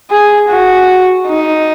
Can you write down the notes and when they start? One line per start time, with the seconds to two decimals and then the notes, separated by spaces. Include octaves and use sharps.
0.11 G#4
0.49 F#4
1.28 D#4